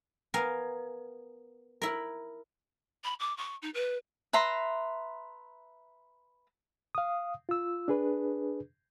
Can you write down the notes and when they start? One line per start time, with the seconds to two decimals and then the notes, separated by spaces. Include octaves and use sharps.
0.34 B3 A#4 F5 G#5
1.82 E4 A#4
3.03 B5
3.20 D6
3.37 C#6
3.62 D#4
3.74 B4
4.33 B4 E5 A#5 C6
6.95 F5 D#6
7.49 F4 E6
7.88 D4 G#4 B4